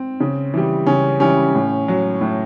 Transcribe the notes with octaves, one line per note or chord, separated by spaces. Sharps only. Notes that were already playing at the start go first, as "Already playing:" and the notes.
Already playing: C4
C#3
E3 G3
C#3 C#4
E3 G3 C#4
A2
F#3
A2